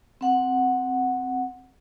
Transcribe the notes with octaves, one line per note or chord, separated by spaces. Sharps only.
C4 F#5